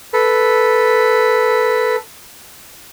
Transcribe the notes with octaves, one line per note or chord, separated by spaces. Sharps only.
A4 B4